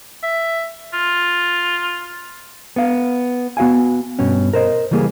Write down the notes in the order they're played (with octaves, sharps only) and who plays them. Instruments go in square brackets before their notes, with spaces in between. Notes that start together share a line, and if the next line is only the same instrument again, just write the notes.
[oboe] E5
F4
[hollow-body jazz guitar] B3 F5
B3 F#4 F5 G#5
G2 B2 C#4
A#4 C5 D#5
C#3 E3 G3 A#3 G#4